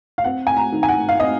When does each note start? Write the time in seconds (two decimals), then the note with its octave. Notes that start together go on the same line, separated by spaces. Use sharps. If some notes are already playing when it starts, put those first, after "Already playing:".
0.18 F5
0.24 C4 F#5
0.47 G#5
0.57 A#5
0.72 D#3
0.83 G#5
0.88 F#5
1.09 F5
1.20 C4 D#5